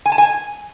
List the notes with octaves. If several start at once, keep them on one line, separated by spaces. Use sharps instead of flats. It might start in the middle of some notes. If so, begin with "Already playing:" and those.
G#5
A5
G#5